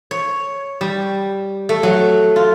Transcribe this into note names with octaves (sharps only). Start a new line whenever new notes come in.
C#5
G3
A3
F#3
F4